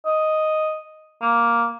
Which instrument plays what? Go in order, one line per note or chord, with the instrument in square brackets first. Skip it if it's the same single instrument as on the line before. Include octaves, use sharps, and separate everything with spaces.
[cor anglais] D#5
A#3